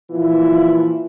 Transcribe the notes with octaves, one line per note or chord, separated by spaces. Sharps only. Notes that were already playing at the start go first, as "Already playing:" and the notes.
A#2 E3 F3 E4 F4